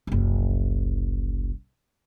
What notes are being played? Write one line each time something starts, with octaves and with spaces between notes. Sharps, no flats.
F#1 C2